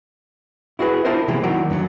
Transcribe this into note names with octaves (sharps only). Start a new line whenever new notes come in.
E4 F#4 G#4 B4
D4 E4 F4 A#4 C5 D#5
C3 E3 F3 G#3 A#3
D#3 F#3 A#3 E4 F#4 D5
F#2 D3 E3 F#3